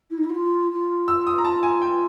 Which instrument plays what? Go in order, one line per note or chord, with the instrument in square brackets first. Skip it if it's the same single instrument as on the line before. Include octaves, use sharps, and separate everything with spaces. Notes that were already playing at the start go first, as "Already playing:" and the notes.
[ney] E4
D#4
E4
F#4
F4
F4
[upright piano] E6
D#6
A#5
A5
G#5
G5